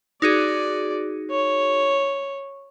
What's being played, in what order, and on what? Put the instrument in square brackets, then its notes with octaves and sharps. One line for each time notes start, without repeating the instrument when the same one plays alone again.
[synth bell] D#4 F#4 G#4 [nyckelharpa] D5
[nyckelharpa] C#5